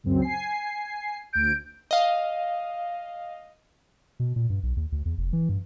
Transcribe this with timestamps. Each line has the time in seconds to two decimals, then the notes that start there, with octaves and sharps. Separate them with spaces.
0.04 C#2 F#2 C4
0.22 G#5 C7
1.33 D2 G6 D7
1.91 D#5 F5
4.20 B2
4.36 A#2
4.50 G2
4.63 B1
4.77 D#2
4.92 D2
5.05 E2
5.18 F1
5.33 E3
5.49 G2